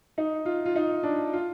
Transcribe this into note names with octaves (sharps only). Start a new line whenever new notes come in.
D#4
F4
F4
D#4
D4
F4